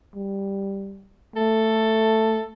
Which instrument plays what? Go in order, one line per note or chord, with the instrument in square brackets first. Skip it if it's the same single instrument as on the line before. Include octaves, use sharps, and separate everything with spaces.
[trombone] G3
[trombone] A3 [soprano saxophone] A4